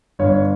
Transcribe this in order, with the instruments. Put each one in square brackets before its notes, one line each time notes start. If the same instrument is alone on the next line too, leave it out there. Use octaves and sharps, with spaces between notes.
[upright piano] G1 C#5